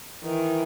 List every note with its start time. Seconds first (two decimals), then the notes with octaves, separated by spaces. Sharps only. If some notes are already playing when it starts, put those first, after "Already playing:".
0.24 D#3 E3